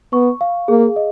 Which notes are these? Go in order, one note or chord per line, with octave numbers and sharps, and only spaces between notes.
B3 C#6
F5
A#3 G#4
D#5